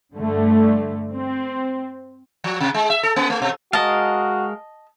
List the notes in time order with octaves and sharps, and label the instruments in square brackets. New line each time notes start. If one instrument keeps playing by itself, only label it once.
[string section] G2 D3 A3
C4
[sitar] F3
C3
G#3
E5
A4
A#3
A3
B2
[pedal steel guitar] G#3 A#4 F5 [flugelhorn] F#4 [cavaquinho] D#5 A5